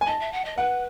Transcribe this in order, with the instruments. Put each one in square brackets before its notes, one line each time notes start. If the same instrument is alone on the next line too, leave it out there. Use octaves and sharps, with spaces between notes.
[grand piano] G#5
[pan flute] D#5 [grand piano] A5
[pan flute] E5
F#5
D#5
[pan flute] B4 [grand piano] F#5